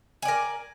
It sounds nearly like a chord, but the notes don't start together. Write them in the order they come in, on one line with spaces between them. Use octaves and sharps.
G#5 D5 A#4